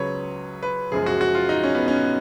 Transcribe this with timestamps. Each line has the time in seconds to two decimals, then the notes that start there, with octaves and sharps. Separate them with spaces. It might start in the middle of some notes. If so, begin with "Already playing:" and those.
Already playing: C#2 C#3 F#3 B4 C#5
0.63 B4
0.91 F#1 F#2 F3 G#3 G#4
1.06 F#4
1.21 F#4
1.35 F4
1.49 D#4
1.64 C#4
1.75 B3
1.88 C#4